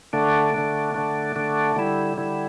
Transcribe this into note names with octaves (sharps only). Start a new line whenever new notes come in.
D3 A3 D4
D3 A3 D4
D3 A3 D4
D3 A3 D4
D3 G3 E4
D3 G3 E4